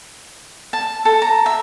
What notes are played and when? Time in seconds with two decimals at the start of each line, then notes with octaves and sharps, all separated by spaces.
0.73 A5
1.05 A4
1.22 A#5
1.46 E5